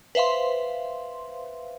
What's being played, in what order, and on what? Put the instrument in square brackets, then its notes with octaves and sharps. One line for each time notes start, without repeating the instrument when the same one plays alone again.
[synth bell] B4 C5 E5 F5 C6